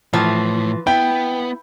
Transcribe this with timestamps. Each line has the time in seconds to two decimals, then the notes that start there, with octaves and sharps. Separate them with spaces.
0.13 A2 E3 F3
0.87 B3 E4 G5